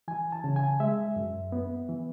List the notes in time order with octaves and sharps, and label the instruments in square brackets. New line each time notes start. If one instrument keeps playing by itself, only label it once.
[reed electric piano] E3 G#5
A5
C#3
G#5
G#3 E5
F#2
B3
E3